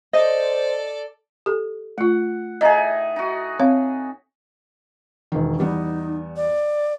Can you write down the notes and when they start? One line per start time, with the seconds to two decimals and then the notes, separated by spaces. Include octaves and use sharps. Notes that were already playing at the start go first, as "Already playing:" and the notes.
0.13 A4 C5 D5 D#5
1.46 G4 A4
1.98 A3 F4 F#5
2.61 A2 D#4 G#4 D#5 A#5
3.16 D#4 F#4
3.60 C4 C#5 F5
5.32 E1 D#3
5.59 E2 G3 B3 D#4
6.37 D5